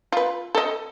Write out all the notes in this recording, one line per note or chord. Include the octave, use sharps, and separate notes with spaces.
F4 B4
A4 D#5